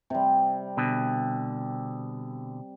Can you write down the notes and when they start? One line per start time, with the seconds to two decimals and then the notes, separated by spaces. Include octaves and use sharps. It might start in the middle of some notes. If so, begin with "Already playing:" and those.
0.10 C3 G3
0.77 B2 D3